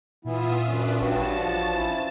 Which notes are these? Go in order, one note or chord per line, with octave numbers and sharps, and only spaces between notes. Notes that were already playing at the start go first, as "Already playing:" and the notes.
A#2 E3 B3 E4 F4 E5 D#6
F#2 C#4 D4 B4
A1 G2 F#4 C#5 A5 A6 E7
F3
C#4 E4